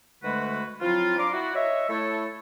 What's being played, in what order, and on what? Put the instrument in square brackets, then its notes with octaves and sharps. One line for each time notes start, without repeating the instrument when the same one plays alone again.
[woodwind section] D2 D3 G#3 A3 F#4 B4
F3 F#3 C4 E4 F4
D4 F5 A#5 C6 D6
E4 F#4
C#5 D#5 E5
A3 E4 A4 C#5